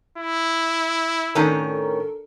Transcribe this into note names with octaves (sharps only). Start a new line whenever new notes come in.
E4
A2 D#3 C#4 D4 A4 A#4